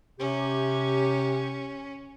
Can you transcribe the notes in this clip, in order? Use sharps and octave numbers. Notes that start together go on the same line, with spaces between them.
C3 C#4 G4